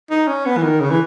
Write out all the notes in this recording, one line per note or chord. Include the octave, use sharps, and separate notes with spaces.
D#4
C#4
B3
E3
D#3
C#3
E3